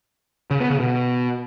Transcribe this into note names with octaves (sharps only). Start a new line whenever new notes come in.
C#3
B3
C#3
B2